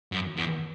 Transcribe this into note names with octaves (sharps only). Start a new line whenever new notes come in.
F#2
E2